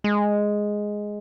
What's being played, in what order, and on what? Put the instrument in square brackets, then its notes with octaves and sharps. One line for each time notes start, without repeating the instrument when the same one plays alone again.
[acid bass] G#3